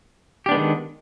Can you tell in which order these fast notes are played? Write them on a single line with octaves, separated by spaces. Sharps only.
G4 D4 B3 G#3 D#3